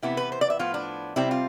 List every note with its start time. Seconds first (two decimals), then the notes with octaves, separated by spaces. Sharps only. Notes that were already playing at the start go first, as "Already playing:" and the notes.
0.02 C3 E3 B3 E4
0.17 B4
0.32 C5
0.41 D5
0.50 E5
0.59 A2 F3 B3 F4
0.74 D4
1.16 C3 G3 C4 E4
1.31 F4